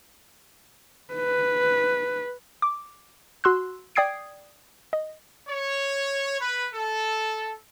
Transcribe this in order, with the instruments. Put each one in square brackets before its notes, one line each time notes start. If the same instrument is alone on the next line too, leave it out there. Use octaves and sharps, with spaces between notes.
[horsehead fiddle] B4
[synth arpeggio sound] D6
F#4 C6 E6 F#6
D5 G5 D#6 G#6 C7 D7
D#5
[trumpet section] C#5
B4
A4